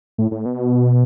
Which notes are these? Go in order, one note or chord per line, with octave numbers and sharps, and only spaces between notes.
A2
A2
B2